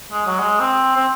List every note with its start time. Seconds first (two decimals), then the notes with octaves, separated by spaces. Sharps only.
0.12 G#3
0.26 F#3
0.39 G#3
0.60 C4
0.96 C4